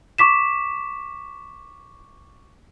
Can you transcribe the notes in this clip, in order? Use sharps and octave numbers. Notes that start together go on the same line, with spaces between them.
C#6 D6 B6 E7